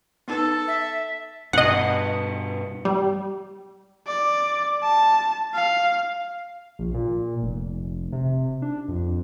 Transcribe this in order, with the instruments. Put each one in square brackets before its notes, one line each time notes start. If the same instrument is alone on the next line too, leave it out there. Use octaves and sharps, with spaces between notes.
[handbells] B3 D#4 B4 [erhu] A4
[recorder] E5
[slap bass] G2 B2 [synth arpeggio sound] D#5 F#5
[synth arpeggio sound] G3
[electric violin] D5
A5
F5
[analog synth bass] A#1
A#2
F1
C3
D4
F2